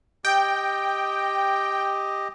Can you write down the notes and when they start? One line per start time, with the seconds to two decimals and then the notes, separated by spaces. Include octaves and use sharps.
0.25 G4 D#5 G5